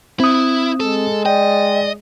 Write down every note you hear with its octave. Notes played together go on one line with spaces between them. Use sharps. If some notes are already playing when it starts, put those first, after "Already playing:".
C4 E4 D#6
G#3 A4
D5 D#5 G5